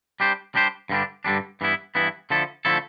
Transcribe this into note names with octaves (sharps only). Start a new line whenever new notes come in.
G3 D4 G4 C5
G3 D4 G4 C5
G2 D3 G3 D4
G2 D3 G3 D4
G2 E3 B3 E4
G2 E3 B3 E4
D3 F3 A3 E4 A4
D3 F3 A3 E4 A4